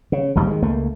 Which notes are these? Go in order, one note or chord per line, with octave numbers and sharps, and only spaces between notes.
C#3
A#1 D#2 G#2 G3
D#3 G#3
C#2 A3 A#3